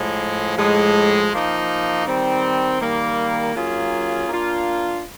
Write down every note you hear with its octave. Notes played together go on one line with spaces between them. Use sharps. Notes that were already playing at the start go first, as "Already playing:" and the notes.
Already playing: A2 F3 G#3
A2 F3 G#3
F3 A#3 D#4
D#3 G3 C4
D#3 G3 A#3
F#3 A#3 C#4 F4 G#4
A#3 D4 F4